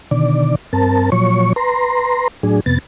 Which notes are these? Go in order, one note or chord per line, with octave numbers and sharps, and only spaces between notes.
B2 D3 D#3 D5
G2 C4 A#4 A5
A#2 F3 F#3 C#5 C#6
B4 A#5 C6
A2 F#3 D4 G#4
F2 C3 B3 A6